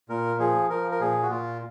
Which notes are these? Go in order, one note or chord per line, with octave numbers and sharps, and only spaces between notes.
A#2 A#4
F3 G#4
F3 A#4
A#4
A#2 G#4
F#4
A#2 F4